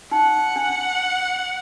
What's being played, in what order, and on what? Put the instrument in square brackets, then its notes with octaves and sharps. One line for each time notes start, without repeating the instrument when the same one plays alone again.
[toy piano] D#4 [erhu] F#5
[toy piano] D4